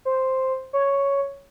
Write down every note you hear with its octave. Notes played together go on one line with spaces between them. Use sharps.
C5
C#5